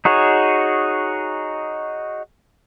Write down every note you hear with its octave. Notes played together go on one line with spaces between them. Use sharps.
D#4 F#4 G#4 C#5